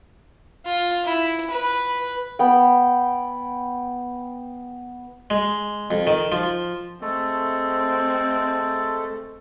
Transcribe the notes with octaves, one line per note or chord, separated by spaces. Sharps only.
F4
E4
B4
B3 G5
G#3
F2
D#3
F3
G#3 A3 C4 A4